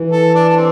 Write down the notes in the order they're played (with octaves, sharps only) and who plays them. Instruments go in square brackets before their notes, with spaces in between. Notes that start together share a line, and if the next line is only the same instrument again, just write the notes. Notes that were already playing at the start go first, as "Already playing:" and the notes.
Already playing: [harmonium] E3
[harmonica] A4
D4
D4
C4